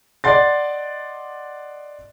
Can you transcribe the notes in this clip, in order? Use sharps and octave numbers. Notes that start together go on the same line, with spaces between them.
D5 D#5 F#5 C6 A6